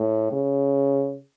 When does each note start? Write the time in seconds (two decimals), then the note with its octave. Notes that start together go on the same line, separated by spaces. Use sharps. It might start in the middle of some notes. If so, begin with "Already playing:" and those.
Already playing: A2
0.32 C#3